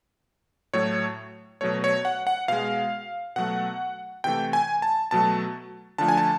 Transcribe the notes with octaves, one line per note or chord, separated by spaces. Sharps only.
A2 F#3 A3 C#5
B2 F#3 A3 C#5
C#5
F#5
F#5
B2 G#3 F5
B2 F#3 A3 F#5
C3 E3 A3 G5
G#5
A5
B2 F#3 A3 A5
D3 F3 A3 A5
G#5
A5